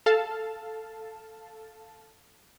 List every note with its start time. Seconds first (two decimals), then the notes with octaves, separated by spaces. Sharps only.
0.06 A4 F5 A5